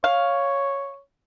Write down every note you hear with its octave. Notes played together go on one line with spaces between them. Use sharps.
C#5 F5